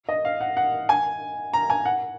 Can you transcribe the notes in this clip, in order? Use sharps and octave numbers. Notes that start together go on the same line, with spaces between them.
D#5
F5
F#5
F#5
G#5
A#5
G#5
F#5